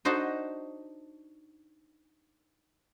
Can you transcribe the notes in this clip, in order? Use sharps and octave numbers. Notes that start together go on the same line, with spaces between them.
D4 D#4 F#4 C5 D#5